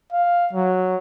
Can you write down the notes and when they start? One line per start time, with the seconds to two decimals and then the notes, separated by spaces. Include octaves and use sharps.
0.12 F5
0.53 F#3